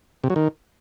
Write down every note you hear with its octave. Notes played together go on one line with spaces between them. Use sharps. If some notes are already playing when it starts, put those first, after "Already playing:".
C3
F#3
D#3